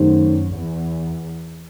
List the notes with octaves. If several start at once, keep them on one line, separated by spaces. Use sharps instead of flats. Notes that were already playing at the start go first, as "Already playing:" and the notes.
Already playing: F#2 D#3 A3 D#4 G4 C5
E2